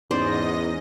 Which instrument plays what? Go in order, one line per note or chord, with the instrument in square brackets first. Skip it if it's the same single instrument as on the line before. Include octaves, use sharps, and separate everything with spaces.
[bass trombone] E2 [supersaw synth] G#2 D#5 A#6 [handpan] C#4 D#4 [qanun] C5 D5